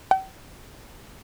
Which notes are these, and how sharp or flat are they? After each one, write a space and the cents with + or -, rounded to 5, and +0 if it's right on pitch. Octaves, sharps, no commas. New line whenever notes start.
G5 -45